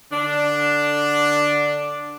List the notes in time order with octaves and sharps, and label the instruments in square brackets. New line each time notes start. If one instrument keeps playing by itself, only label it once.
[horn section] D3 D4